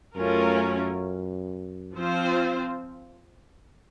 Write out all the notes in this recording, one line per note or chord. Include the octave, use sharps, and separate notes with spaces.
F#2 A3 C#4 F4 A#4
F3 C4 F4 C5